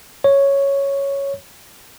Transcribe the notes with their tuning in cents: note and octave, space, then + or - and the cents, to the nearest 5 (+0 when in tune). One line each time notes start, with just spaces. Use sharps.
C#5 +0